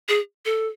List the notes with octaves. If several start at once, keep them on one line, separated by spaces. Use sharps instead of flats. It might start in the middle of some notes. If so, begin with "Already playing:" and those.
G#4
A4